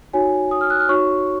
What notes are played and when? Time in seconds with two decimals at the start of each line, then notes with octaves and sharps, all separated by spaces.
0.13 D#4 F#4 C#5 G#5
0.51 D#6
0.61 F6
0.70 F#6
0.80 F6
0.89 D#4 F#4 C#5 C#6